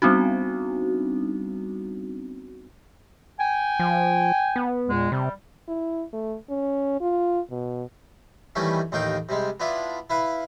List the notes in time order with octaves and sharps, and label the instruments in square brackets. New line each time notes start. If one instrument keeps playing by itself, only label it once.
[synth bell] G3 B3 C4 D4 D#4 F#4
[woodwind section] G5 G#5
[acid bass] F3
B3
[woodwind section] E2 A#2 G#3
[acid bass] C3 [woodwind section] G3
[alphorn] E4
A3
C#4
F4
B2
[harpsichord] D#3 E3 G3 A3 C#4
A1 D#2 D#3 D#4 F5 G5
C3 G3 G#3
B3 D4 E4 F4
E4 B4 F5